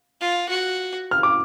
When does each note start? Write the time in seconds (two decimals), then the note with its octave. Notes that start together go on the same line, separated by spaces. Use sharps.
0.21 F4
0.49 F#4
1.11 F6
1.23 D6